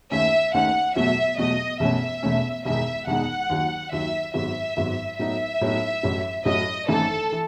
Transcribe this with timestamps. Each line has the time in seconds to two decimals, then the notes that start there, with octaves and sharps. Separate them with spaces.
0.11 D#2 D#3 A3 C#4 E5
0.54 D#2 D#3 A3 C#4 F#5
0.96 E2 B2 F#3 A3 E5
1.38 E2 B2 F#3 A3 D#5
1.80 E1 E2 B2 A3 C#4 E5
2.23 E1 E2 B2 A3 C#4
2.65 E1 E2 D#3 G#3 D#4 E5
3.07 E1 E2 D#3 G#3 D#4 F#5
3.50 D#2 D#3 F#3
3.92 D#2 D#3 F#3 E5
4.34 G#1 G#2 F#3 B3 E5
4.77 G#1 G#2 F#3 B3
5.19 A2 F#3 B3 D#4 E5
5.61 A2 F#3 B3 D#4
6.03 A1 A2 F#3
6.45 A1 A2 F#3 D#5
6.88 G#1 F#2 E3 A3 D#4 A4
7.32 E3